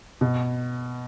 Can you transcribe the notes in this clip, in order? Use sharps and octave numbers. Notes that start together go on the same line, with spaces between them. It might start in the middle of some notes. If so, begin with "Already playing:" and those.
B2